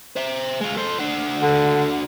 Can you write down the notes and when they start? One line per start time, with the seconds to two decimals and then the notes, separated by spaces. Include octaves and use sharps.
0.16 C5 E5
0.61 G#3 F4
0.77 A4 C5
0.99 D4 F#4
1.41 D3